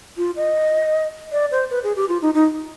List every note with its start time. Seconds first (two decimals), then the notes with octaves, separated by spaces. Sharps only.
0.17 F4
0.36 D#5
1.32 D5
1.51 C5
1.71 B4
1.84 G#4
1.96 G4
2.09 F4
2.22 D#4
2.34 D#4